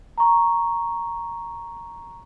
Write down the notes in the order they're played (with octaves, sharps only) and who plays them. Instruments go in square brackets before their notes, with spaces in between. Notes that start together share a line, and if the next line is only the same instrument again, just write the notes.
[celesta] A#5 C#6